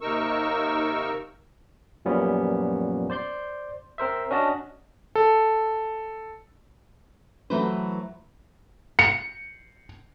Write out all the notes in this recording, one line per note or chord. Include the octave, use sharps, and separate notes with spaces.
D#2 C3 D#4 A#4 C#6 E6
F#2 A#2 F3 G3 B3 C#4
C5 D5 C6 G6
C4 A#4 C5 E5
C#4 D4 F#4 D#5 A5
A4
E3 F#3 A3 F#4 B4 C5
C#7